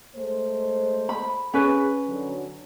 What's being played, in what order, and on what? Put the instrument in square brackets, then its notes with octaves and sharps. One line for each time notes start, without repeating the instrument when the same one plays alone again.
[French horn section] G#3 A3 C5
[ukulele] B5
[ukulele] C#4 B4 [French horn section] G#4
[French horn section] D3 F#3